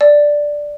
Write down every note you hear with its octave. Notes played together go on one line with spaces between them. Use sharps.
D5